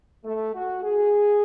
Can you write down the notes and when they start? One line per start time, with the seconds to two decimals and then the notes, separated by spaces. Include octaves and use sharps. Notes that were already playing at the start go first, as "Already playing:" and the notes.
0.24 A3
0.54 F#4
0.83 G#4